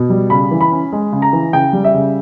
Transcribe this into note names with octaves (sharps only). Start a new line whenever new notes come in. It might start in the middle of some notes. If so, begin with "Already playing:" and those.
Already playing: B2
G3
C#3 B5
E3
B5
C#4
G#3
C#3
A#5
E3
C#3 G5
G3
E5
C#3